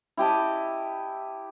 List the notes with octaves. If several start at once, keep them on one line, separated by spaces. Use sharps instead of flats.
E4 G4 D#5 A5